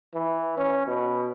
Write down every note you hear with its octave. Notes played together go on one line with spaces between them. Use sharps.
E3
C#4
B2